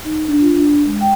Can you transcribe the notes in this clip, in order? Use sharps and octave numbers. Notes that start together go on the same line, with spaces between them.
D#4
D4
F4
D4
G#3
G5